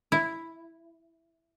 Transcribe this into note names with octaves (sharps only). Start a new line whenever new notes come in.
E4